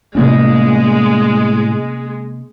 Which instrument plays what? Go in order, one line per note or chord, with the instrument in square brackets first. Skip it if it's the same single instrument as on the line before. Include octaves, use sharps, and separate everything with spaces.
[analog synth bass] A2 [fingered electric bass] C3 A#3 C#4 [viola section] G#3